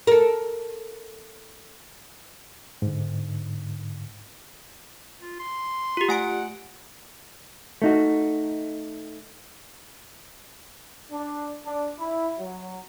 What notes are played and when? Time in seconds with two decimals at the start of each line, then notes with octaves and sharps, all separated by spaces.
0.07 A4 A#4
2.82 G#2 D3
5.21 F4
5.40 C6
5.97 F4 G4
6.09 A3 F#5 G#5 D7
7.82 A3 D#4 F#4
11.10 D4
11.65 D4
11.97 E4
12.37 F#3